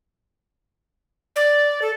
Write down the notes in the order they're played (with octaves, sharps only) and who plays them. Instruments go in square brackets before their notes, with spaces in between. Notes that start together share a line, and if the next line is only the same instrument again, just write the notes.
[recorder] D5
A4